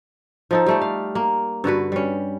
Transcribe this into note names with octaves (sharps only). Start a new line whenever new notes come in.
F3 D#4 A4
G3 A3 G4
F5
A#3
G2 D3 F#4 B4
G3 C#4